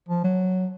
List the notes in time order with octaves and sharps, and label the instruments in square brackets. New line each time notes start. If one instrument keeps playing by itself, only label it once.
[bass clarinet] F3
F#3